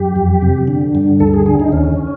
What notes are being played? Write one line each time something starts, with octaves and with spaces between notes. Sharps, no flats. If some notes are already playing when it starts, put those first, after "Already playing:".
Already playing: F#2 G4
F2
C3
D3
G2
D2 A4
G#4
D3 G#4
D#4
D#2 C#4